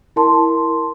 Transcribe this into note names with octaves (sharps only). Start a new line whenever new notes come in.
E4 A#4 A5 C6